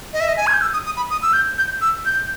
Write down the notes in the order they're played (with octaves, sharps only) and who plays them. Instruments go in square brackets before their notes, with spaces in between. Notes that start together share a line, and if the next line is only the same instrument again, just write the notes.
[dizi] D#5
E5
D#5
G#5
G#6
G6
E6
D#6
D#6
B5
D#6
E6
G6
G6
E6
G6